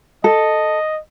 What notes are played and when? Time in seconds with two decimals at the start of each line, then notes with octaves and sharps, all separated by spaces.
0.24 A4 D#5